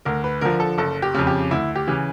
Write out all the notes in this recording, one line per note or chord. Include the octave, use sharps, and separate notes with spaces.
D2 A#4
B4
D3 F3 A#4
A4
F#1 A4
G4
F2 C#3
G4
D2 E4
G4
C#3 E3